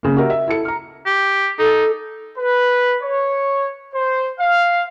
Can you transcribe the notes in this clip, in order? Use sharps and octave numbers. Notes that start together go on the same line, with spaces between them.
C#3 A#3
F#4 G4 A#4 E5
E5
E4 A4 C#7
A#5 F6
G4
D#4 A4
B4
C#5
C5
F5